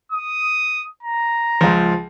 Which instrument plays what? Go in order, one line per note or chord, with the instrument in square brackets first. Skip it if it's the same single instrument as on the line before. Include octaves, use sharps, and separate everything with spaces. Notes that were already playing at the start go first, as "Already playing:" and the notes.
[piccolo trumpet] D#6
A#5
[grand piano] C#2 F3